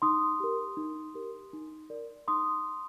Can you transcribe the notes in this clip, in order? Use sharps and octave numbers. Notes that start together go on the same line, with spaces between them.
D#4 C6 D#6
G4 A#4
D#4
G4 A#4
D#4
A#4 D5
D#4 C6 D#6